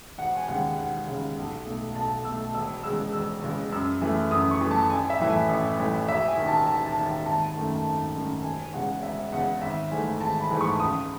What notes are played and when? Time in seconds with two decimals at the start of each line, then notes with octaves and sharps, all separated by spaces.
0.18 E1 F#5
0.37 G#5
0.48 D#2 C#3 G#3 F#5
0.77 E1 F#5
1.07 D#2 C#3 G#3
1.37 B1
1.66 B2 A3
1.95 B1 A5
2.25 B2 A3 E6
2.54 E1 E6
2.84 E2 C#3 G#3 E6
3.13 E1 E6
3.43 E2 C#3 G#3
3.72 F#2 E6
4.02 E3 A3
4.31 F#2 D#6
4.51 C#6
4.61 E3 A3
4.71 A5
4.90 A1 G#5
5.10 E5
5.20 A2 E3 A3
5.30 G#5
5.49 A1
5.78 A2 E3 A3
6.08 E1 E5
6.28 G#5
6.37 D#2 D#3
6.48 A5
6.67 E1 A5
6.87 A5
6.97 D#2 D#3
7.06 A5
7.26 G#1 A5
7.55 F#2 D#3 A3
7.85 G#1
8.15 F#2 D#3 A3
8.44 E1 G#5
8.73 E2 C#3 G#3 F#5
9.03 E1 E5
9.32 E2 C#3 G#3 F#5
9.62 G#1 E5
9.91 G#2 E3 A3 G#5
10.21 G#1 A5
10.40 B5
10.50 G#2 E3 A3
10.61 C#6
10.80 C#2 D#6